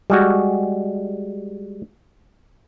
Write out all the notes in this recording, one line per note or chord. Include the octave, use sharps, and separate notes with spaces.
G3 G#3 F#4